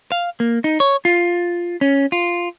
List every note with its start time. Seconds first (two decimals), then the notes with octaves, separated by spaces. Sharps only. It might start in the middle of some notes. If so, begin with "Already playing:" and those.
0.12 F5
0.40 A#3
0.64 D#4
0.80 C#5
1.05 F4
1.81 C#4
2.12 F4